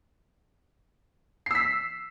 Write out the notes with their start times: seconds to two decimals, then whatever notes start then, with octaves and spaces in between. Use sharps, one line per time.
1.46 C7
1.51 E6
1.55 B6